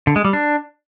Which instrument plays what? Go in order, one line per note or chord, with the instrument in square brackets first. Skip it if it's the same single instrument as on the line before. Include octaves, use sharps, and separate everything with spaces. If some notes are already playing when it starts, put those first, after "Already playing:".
[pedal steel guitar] D3
G#3
G3
D4